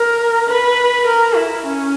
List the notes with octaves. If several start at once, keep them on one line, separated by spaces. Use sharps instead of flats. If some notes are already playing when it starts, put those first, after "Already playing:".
Already playing: A#4
B4
A#4
E4
C#4